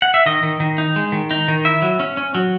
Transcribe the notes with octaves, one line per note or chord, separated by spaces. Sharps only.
F#5
E5
D#3 D#5
D#3
D#3
D#4
G#3
D#3
D#4
D#3
E4 E5
F#3
C#4
C#4
F#3